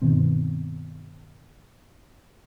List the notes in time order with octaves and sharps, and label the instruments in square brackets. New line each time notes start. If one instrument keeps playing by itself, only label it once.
[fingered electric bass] G2 B2 D#3 C4